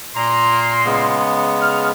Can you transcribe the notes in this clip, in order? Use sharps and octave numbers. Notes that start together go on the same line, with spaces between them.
A#2 A#3 A#5 C6
C#3 G#3 B3
F6